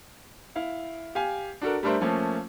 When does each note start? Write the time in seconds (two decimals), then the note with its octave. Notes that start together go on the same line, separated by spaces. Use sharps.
0.55 E4 F5
1.15 G4 F5 G#5
1.62 D4 F#4 A4 A#4
1.83 G3 A3 D4 A#4 C5 E5
2.01 F3 A3 A#3 C#4